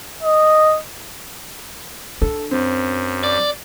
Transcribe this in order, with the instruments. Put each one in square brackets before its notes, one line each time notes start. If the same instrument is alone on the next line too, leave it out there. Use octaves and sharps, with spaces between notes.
[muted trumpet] D#5
[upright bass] D4 [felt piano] A4
[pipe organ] F#2 [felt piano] C4
[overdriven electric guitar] D5